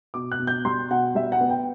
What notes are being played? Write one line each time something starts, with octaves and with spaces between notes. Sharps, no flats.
B2 D6
F#6
B2
G6
G3 C6
B2 F#5
G3 E5
F#5
B3
G5